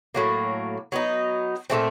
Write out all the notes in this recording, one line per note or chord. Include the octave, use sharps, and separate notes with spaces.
A2 F#3 A#3
F#3 B3 D#4
A#2 F#3 A3 C4